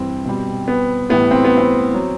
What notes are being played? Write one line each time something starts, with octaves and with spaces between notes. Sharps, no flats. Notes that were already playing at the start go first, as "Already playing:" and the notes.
Already playing: G2 E3 G3 C4
B2 G3
B3
A2 E3 G3 B3
C4
B3
C4
F#3